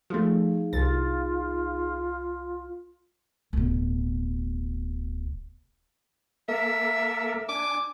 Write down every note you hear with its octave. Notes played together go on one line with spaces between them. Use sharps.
F3 A3 D#4 G#4 F5
C2 F4 A6
D1 B2
A#3 A4 A#4 E5
D4 G#5 D6